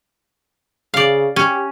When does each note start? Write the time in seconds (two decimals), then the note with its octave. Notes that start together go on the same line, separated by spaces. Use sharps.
0.94 C#3 D5 F5
1.36 C#4 G4